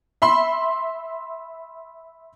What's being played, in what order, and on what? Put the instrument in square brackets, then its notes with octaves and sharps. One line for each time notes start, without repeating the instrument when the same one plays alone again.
[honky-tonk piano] E5 B5 C6